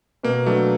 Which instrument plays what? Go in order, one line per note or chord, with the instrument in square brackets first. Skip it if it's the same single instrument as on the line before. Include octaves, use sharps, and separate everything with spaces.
[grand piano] B2 [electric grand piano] A#3
[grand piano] F#3 B3 D4 [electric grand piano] A3